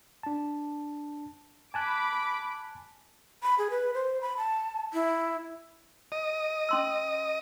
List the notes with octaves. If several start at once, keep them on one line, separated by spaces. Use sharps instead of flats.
D4 A5
G#5 A5 B5 D6 F#6
B5
G#4
B4
C5
B5
A5
E4
D#5
C#4 C6 E6